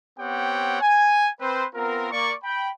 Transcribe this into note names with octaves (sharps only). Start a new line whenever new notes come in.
B3 C4 G4 C#5 F#5 G5
G#5
C4 B4 C5
B3 C4 F4 A#4
A#3 D5 C#6
G5 B5